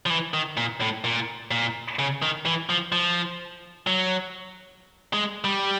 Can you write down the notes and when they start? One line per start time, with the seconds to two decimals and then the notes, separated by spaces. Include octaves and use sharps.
0.06 F3
0.10 E3
0.34 D#3
0.57 A#2
0.81 A2
1.04 A#2
1.51 A#2
1.99 C#3
2.22 D#3
2.46 E3
2.69 F3
2.92 F3
3.87 F#3
5.13 G#3
5.44 G3